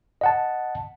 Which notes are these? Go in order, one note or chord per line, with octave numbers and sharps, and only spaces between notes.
D#5 F#5 A5